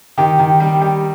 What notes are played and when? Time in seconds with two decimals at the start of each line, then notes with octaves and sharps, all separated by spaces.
0.18 D#3 G4
0.39 D#3
0.60 G3
0.81 G3